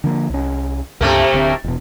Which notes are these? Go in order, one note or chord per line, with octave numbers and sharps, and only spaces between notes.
D3 F3 A#3
C2 C#4
C#2 G2 C3 A3 A#3
D1 D3 C4
E1 B2